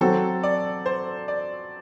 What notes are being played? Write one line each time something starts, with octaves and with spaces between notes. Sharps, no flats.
F#3 C4 F#4 A4
D5
C5
D5